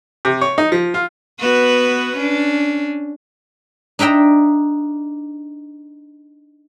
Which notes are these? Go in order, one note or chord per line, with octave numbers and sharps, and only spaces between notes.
C3
C#5
D#4
F3
F4
B3 F#4 B4
C#4 D4
D4 D#4 E5 G5 A#5